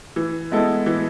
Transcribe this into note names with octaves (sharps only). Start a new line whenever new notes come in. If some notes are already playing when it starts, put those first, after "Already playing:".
E3
G#3 B3 E4 A4
E3